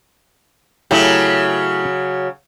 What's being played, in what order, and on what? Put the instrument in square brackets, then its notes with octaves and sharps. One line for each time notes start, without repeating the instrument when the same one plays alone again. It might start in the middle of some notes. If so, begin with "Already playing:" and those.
[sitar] C#3 F#3 [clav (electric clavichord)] A3 E4 G4